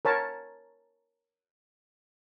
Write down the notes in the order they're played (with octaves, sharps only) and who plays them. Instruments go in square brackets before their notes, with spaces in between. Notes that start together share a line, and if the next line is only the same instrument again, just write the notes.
[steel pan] A#4 C#5 A5